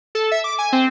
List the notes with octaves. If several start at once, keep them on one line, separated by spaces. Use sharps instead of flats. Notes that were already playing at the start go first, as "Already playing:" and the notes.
A4
E5
D6
G#5
C4